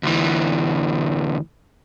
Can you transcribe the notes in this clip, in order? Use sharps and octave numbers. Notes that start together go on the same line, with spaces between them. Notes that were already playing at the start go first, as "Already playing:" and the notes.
D2 E3